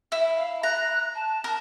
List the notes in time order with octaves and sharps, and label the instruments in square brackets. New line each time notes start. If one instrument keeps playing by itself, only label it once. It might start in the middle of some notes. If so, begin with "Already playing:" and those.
[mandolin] E4
[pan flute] F5
[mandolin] A#5 [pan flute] F#6
[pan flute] A5
[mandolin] A#4